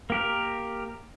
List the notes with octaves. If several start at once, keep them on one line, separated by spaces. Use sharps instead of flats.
A#3 G4 A#4